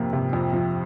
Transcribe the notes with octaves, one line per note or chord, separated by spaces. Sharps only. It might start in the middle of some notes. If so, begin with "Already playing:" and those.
Already playing: F2 C3 F3 A#3
C3
F2
F3